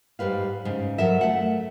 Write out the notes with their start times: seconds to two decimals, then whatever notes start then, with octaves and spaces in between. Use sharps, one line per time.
0.19 G#2 G3 B4 F5
0.65 G#2 C#3
0.98 F#3 A4 A#4 E5
1.21 A3 F#5